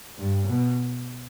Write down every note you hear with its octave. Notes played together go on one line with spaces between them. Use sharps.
G2
B2